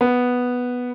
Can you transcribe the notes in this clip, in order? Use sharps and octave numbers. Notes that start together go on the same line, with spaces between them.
B3